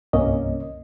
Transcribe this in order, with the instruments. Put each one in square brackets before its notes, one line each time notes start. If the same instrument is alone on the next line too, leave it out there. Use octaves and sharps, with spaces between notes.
[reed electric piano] C2 G2 A#3 C#4 D#5